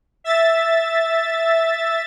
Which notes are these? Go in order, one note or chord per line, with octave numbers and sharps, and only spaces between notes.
E5 A6